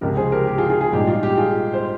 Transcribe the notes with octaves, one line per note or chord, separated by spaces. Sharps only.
C#2 C3 F3 G4 A#4
G#4 C5
G4 A#4
G4
F4 G#4
F4 G#4
F4 G#4
A#1 G#2 G3 G4
F4
G4
F4 G#4
C5